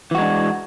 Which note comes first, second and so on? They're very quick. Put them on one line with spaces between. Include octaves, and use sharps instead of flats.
E3 F#4 G#3 D4